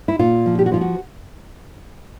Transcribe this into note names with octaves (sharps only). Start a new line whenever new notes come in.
E4
A#2 F4
F3
G4
F#4
F3 F4
F#4